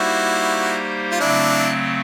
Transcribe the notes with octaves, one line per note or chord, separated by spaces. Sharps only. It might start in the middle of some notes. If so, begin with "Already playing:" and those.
Already playing: G3 A#3 D#4 E4 F#4 G4 C5
F4
C#3 F#3 A3 C4 D4 E4